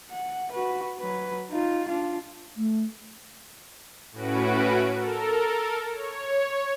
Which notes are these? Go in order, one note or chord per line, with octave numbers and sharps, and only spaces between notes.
F#5
F#4 B4
F#3 B4
D#4 F4
D4 F4
A3
A2 C#4 F#4 B4 D7
A4 A#4
C#5